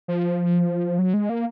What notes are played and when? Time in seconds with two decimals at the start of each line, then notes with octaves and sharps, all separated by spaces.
0.08 F3
0.99 F#3
1.14 G#3
1.29 A#3